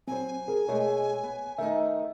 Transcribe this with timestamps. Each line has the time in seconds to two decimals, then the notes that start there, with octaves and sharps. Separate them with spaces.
0.08 F#3 C4 C5 G#5
0.48 G#4 A#4
0.68 B2 G#3 A3 C#5
1.23 B3
1.58 D#3 A3 D#4 E5